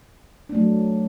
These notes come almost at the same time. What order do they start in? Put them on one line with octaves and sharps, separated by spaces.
D4 A3 F#3